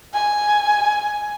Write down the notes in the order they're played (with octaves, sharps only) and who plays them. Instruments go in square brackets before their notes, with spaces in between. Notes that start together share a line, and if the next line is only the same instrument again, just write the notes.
[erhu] G#5